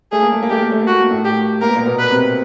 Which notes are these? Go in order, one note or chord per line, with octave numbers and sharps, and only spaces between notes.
A3 G#4
A#3
A3
A#3
A3 G4
A#3
A3
A#3
A3 F#4
A#3
A2 A3
G4
A#3 A#4
B3
A#2 A#3
B2 B3
B4
C3 C4